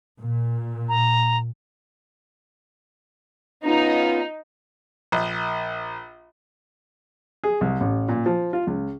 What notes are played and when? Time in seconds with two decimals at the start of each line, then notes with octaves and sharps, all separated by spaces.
0.21 A#2
0.89 A#5
3.65 B3 C#4 D#4 F4
5.12 A#1
7.44 G#4
7.61 C2
7.81 A1
8.08 A#2
8.26 F3
8.53 F4
8.67 C#2